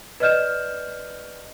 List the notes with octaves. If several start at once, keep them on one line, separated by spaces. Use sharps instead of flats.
B4 D5 D#5 F6 G6 E7